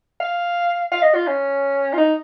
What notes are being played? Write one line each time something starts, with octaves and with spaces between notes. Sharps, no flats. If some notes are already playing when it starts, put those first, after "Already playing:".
F5
F5
D#5
F4
C#4
F4
D#4